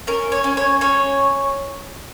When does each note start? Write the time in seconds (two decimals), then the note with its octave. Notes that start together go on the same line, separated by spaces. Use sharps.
0.07 C#4 A#4
0.32 C#5
0.44 C#4
0.57 C#5
0.81 C#4 C#5